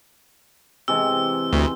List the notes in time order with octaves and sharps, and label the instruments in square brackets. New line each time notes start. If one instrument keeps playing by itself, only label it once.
[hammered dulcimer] C3 E3 G#3 [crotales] E6
[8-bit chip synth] D2